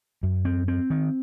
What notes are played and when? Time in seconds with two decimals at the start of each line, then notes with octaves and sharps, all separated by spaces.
0.23 F#2
0.45 C4
0.68 C4
0.90 D#3